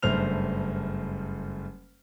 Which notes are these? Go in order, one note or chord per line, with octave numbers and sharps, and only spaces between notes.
F#1 G2 A3 C5 F6 F7